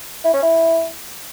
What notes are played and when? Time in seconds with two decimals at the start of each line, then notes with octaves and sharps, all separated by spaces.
0.24 E4
0.34 C#4
0.42 E4